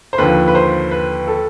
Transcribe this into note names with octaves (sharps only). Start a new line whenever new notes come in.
C5
D#2 D3 F3 B4
B4
C5
B4
A4